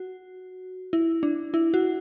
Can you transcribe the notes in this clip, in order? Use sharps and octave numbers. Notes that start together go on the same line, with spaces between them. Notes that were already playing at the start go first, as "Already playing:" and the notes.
Already playing: F#4
E4
D4
E4
F#4